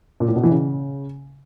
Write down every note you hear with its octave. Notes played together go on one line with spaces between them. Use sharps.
A#2
A2
B2
E3
C#3